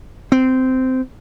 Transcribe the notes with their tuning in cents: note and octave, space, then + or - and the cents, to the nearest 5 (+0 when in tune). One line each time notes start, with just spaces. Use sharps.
C4 -15